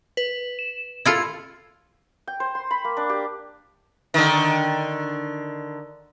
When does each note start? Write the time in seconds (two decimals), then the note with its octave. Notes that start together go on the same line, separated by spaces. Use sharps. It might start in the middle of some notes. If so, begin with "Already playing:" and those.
0.17 B4
0.59 E7
1.05 E4 F4 A4 G#6
2.27 G5
2.40 C5
2.55 C6
2.71 B5
2.84 A#3
2.97 D4
3.09 G4
4.14 D3 D#3